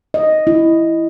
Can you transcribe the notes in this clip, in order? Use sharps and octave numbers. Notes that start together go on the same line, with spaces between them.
D#5
E4